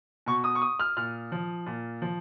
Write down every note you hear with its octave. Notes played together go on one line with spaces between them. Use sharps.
B2 C#6
D#6
C#6
D#6
F6
A#2 F6
F3
A#2
F3